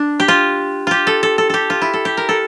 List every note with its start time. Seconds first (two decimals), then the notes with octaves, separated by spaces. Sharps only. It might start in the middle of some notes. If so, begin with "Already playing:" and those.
Already playing: D4
0.20 G4
0.28 F4
0.87 F4 G4
1.07 A4
1.23 A4
1.38 A4
1.50 G4 A4
1.70 F4
1.82 E4
1.93 A4
2.05 G4
2.17 A#4
2.29 A4